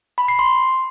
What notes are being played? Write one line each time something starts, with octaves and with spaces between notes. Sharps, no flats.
B5
C7
C6